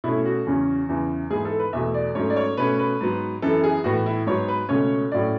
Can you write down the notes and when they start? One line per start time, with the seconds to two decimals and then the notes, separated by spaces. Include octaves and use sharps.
0.04 B2 A3 C#4 E4
0.25 F#4
0.47 E2 C#3 F#3 C#4
0.89 E2 C#3 E3
1.30 G#2 E3 B3 G#4
1.45 A4
1.59 B4
1.73 E2 B2 A3 E5
1.94 D5
2.15 G#2 F#3 A3 C#4 C#5
2.30 D5
2.36 C#5
2.57 B2 A3 C#4 B4
2.79 B4
3.01 G#2 F#3 B3
3.42 F#2 E3 B3 A4
3.64 G#4
3.84 A2 E3 B3 F#4
4.06 E4
4.27 G#2 F#3 B3 C#5
4.48 B4
4.69 C#2 B2 A3 C#4 C#5
5.12 A2 F#3 C#4 D5